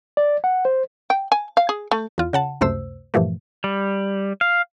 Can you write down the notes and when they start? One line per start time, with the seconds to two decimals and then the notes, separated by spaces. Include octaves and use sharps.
0.17 D5
0.44 F#5
0.65 C5
1.10 G5
1.32 G#5
1.57 F5
1.69 G#4
1.91 A3
2.18 E2 F4
2.33 C#3 F#5 A5
2.61 C#2 F#2 C3 A3 C5 E6
3.14 G2 A#2 E3 F3 A3
3.64 G3
4.41 F5